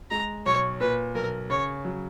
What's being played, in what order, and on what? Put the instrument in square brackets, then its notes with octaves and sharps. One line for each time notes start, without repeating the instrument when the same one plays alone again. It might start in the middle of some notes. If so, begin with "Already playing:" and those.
[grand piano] G#3 [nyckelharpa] A#5
[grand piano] B1 [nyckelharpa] C#5
[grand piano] A#2 [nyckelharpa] B4
[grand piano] B1 [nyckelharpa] A#4
[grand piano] C#3 [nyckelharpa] C#5
[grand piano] F#3